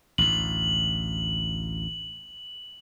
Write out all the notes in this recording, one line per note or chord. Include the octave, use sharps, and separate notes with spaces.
A1 D2 A2 F#7